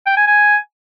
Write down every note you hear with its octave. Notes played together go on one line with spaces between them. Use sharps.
G5
G#5
G#5